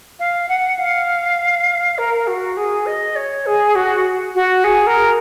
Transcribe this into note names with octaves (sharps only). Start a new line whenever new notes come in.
F5
F#5
F5
A#4
F#4
G#4
D#5
C#5
G#4
F#4
F#4
G#4
A#4